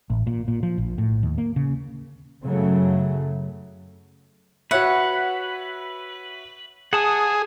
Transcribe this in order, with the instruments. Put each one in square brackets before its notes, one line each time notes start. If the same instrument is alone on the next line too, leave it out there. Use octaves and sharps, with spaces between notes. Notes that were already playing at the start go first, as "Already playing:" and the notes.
[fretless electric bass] A1
A#2
A#2
F3
A#1
A2
D#2
A#3
C#3
[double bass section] F#2 C#3 F#3 A3
[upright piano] F#4 C#5 E5 [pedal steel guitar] B4 [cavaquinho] F#5
[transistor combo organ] G#4 [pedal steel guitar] F#5 A5 D#6